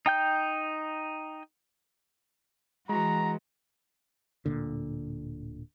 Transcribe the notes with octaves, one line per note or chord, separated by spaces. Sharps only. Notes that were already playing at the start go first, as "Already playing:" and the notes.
D#4 G5 G6
E3 G#3 F#4 A#5
D1 A#2 D3